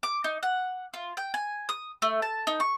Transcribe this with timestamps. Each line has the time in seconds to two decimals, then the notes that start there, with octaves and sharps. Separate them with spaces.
0.03 D6
0.24 D#4
0.43 F#5
0.94 F4
1.17 G5
1.34 G#5
1.69 D#6
2.02 A3
2.22 A5
2.47 D#4
2.60 C#6